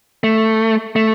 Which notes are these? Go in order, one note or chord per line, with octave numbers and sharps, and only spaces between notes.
A3
A3